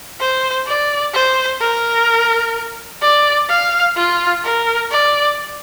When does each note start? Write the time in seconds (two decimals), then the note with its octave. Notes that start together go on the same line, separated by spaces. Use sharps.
0.20 C5
0.67 D5
1.14 C5
1.60 A#4
3.02 D5
3.49 F5
3.96 F4
4.44 A#4
4.91 D5